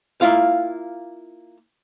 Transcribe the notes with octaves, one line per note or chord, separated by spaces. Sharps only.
A#3 E4 F4 F5